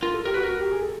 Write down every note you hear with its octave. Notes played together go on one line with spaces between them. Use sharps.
F4 A#4
A4
G4 A#4
F#4 B4
A#4
F#4
G4
G#4
A4